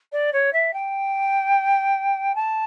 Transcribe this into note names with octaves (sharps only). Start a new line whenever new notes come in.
D5
C#5
E5
G5
A5